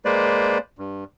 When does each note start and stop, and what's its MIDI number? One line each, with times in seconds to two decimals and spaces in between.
0.05 0.58 56
0.05 0.58 58
0.05 0.58 71
0.05 0.58 72
0.05 0.58 74
0.79 1.04 43